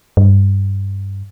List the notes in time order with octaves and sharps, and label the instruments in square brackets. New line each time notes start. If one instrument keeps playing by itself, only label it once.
[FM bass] G2